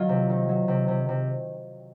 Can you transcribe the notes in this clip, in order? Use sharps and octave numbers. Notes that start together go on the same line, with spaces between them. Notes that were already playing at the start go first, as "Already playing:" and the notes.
Already playing: D#3 F#3 F4
C3
D#3
F#3
C3
C3
C3